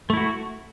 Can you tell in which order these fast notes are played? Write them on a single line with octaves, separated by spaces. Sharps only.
A3 E4 F#4